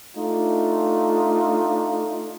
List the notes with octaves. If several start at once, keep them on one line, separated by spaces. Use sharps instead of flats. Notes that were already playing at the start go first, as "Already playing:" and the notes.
A3 D4 D#4 F4